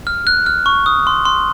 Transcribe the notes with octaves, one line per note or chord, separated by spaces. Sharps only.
F6
F#6
F6
C#6
D#6
C6
C6